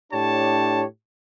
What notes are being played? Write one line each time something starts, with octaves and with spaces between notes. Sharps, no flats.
A2 D4 G4 C#5 A5